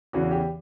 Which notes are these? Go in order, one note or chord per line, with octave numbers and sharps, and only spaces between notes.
E2 C#3 E3 F#4
G4